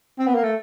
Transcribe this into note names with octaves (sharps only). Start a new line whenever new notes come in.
C4
B3
A#3
A3